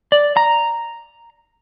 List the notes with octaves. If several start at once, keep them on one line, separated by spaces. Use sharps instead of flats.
D5
A#5